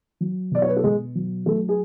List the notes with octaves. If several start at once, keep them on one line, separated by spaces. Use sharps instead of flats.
F#3
B2 D5
C#5
B4
A4
B2 G#3 G#4
F#3
F#3 A3 A4
G#4